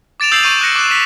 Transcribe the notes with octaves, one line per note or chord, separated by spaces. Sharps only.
D6 A6 D7 E7 F7
D#6 E6 G6 A6 C7 F#7
C#6 G6 A6 D7 D#7
D#6 F#6 G6 A#6 C#7
D6 F#6 E7
B6